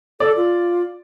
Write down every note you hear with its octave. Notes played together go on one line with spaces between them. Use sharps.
A4 D5
F4